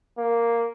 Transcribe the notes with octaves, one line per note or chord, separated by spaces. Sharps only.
A#3